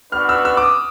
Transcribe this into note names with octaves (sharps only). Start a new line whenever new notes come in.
B3 D4 F#4 B4 F6
E6
E6
D6
D#6